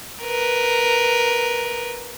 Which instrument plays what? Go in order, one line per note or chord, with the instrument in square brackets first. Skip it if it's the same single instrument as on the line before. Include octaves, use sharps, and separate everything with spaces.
[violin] A#4 B4